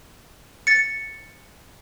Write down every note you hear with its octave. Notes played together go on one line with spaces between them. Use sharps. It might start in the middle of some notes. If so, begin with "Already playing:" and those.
A6 C#7